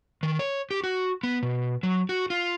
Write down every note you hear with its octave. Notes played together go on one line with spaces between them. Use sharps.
D#3
C#5
G4
F#4
B3
B2
F#3
F#4
F4